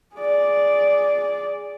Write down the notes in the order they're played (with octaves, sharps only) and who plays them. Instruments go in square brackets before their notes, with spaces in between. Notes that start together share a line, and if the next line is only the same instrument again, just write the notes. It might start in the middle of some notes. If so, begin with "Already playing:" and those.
[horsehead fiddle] G#4 D5